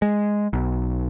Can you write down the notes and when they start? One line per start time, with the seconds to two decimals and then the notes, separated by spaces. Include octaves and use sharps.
0.02 G#3
0.53 B1